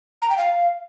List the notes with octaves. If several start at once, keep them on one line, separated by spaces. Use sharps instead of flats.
A#5
G5
F5